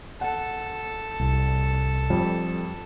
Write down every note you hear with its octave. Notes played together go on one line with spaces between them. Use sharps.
A4 F#5
C2
F2 G3